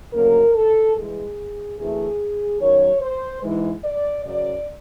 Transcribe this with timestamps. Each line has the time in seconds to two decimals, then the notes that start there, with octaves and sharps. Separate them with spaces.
0.13 D2 C#3 F#3 A#3 A#4
0.55 A4
0.95 G2 E3 G#3 G#4
1.78 D2 C3 E3 A3 G#4
2.60 F#2 D#3 F#3 C#5
3.01 C5
3.43 G#2 E3 G#3
3.84 D5
4.25 F#2 C#3 F#3 D5